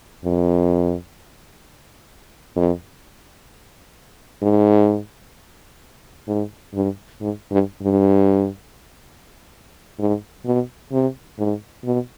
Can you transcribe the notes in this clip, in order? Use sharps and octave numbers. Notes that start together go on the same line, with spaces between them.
F2
F2
G#2
G#2
G2
G#2
G2
G2
G#2
B2
C3
G#2
B2